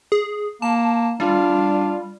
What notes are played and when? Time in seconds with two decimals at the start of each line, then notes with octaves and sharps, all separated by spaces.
0.12 G#4
0.62 A#3 A5
1.20 G3 D4 F4